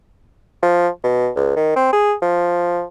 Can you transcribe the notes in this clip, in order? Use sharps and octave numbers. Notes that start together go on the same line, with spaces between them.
F3
B2
C#2
D#3
C4
G#4
F3